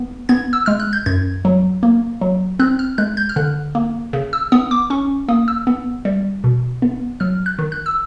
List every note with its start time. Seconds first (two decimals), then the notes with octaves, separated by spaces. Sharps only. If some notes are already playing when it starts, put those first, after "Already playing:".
Already playing: B3
0.29 B3 G#6
0.53 E6
0.66 G#3 F6
0.80 F#6
0.93 G6
1.06 F#2 G#6
1.45 F#3
1.83 A#3
2.21 F#3
2.59 C4 F#6
2.79 F6
2.98 G#3 F#6
3.17 G6
3.29 F6
3.36 D3 F#6
3.75 A#3
4.13 C#3
4.33 E6
4.52 B3 D#6
4.71 D6
4.90 C#4 C#6
5.29 A#3 D#6
5.48 E6
5.67 B3
6.05 G3
6.44 B2
6.82 B3
7.20 F#3 F6
7.46 F#6
7.59 D#3
7.72 F#6
7.86 E6